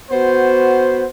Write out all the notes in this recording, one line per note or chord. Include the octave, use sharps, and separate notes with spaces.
B3 F#4 C5